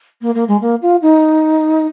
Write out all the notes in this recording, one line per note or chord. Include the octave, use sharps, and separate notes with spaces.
A#3
A#3
G#3
A#3
F4
D#4